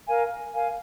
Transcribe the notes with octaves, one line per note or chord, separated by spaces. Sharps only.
A#4 F5 G#5
A#4 F5 G#5